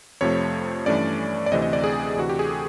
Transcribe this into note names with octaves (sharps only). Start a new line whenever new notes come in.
F2 C3 F3 A3 C#5
G2 E3 A3 C#4 D5
D5
D2 C3 E3 A3 C4 D#5
D#5
D5
G#4
D2 C3 E3 F#4
G4
G#4
A4